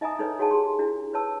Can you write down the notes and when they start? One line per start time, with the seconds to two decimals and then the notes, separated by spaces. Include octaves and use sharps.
0.01 D#4 D#5 E5 G#5 A#5 D#6
0.19 D4 D#4 A4 B4 C#5
0.39 F#4 G#4 C#5 F#5 G#5 A5
0.51 G4 G#4 C6
0.79 D4 E4 F#4 A#4
1.13 B4 C#5 A5 E6